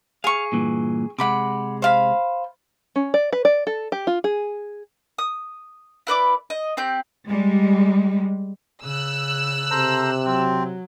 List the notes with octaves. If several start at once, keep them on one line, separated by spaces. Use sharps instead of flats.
G#4 F5 C#6
G2 A#2 E3
C3 G#3 F#5 B5 D6
C5 F5 B5
C#4
D5
B4
D5
A4
G4
F4
G#4
D#6
E4 B4 D5 D6
D#5
C4 G4 G6
G3 G#3
C#3 E6 F#6
C3 A4 C5 A#5
F#3 C4